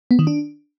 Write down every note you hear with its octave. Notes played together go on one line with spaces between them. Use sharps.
B3
D#3
D4